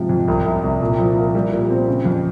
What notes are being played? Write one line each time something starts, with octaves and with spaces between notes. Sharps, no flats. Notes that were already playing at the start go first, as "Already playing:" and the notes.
Already playing: G#2 C3 F3
F2
C2
C2
C2
A#2
F3
A#3
G3
A#2
C4
C#3
F2